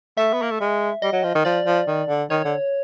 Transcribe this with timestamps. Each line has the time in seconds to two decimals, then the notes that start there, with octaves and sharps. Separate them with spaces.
0.17 A3 E5
0.33 B3
0.42 A#3
0.51 A3
0.61 G#3
1.02 G3 D#5
1.13 F#3
1.24 F3
1.35 D#3
1.45 F3 D5
1.66 F3
1.88 D#3
2.08 D3
2.30 D#3 C#5
2.44 D3